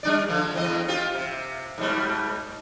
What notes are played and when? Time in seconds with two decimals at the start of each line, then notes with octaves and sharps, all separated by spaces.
0.03 G3 D4 D5
0.28 D3 F3
0.54 E2 C4 D#5
0.88 C4 F4 G4
1.14 C3
1.78 G#2 B2 G3